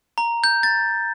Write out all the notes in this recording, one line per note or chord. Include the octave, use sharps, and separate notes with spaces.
A#5
G6
A6